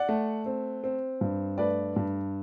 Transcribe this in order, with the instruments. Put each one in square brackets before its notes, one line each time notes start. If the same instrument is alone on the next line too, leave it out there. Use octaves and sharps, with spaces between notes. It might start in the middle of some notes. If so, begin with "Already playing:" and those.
Already playing: [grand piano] D5 F#5
A3
C4
C4
G2
A3 B4 D5
G2